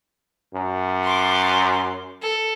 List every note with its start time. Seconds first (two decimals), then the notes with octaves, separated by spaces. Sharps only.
0.55 F#2
1.04 C6 D6
2.22 A4